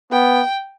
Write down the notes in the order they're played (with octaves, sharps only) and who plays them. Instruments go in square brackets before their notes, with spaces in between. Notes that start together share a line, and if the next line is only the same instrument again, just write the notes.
[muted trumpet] B3 [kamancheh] G5